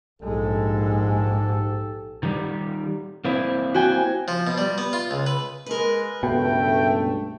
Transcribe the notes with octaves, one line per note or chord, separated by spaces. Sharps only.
A#1 G#2 G#3 G4 A4
D#3 G3
A#3 C4 E4
F#4 G5 G#5
F3
B2
G3
B3
F4
C#2
B4
G#3 A#4 B4
C#2 G2 B2 A3 G5